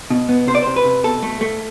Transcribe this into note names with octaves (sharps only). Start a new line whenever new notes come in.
B2
B3
C3 C5
D5
C3 C5
B4
C3
B2 A4
A3
A3